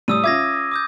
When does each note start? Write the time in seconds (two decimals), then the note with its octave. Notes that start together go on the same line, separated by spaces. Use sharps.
0.08 A2 G3 D#6 E6 D#7
0.24 C#4 F4 E5 D6 G#6 A#6
0.72 D6 D#6 G6